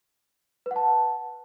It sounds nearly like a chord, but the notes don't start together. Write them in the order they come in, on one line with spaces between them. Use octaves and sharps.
B4 F#5 A5